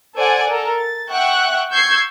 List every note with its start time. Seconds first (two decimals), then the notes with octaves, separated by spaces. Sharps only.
0.15 A4 C5 D5 F#5 G#5
0.50 A4 A#4
0.79 A6
1.11 E5 F#5 G5 C#6 F#6
1.71 C#6 E6 G6 G#6 C7